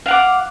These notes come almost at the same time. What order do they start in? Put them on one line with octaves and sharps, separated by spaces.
F5 F#5 D6